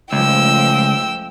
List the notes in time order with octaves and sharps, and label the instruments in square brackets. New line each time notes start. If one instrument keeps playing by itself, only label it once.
[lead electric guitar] C#2 [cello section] F3 G#3 A3 [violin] G5 E6